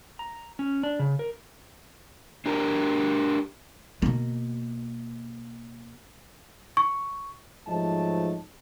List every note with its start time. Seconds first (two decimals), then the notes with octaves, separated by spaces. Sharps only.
0.19 A#5
0.59 C#4
0.83 D4
0.99 C#3
1.19 A#4
2.46 D4 G4 A#4
4.02 B2 A#3
6.77 C#6
7.67 G#2 F3 F#3 A3 D#5 A5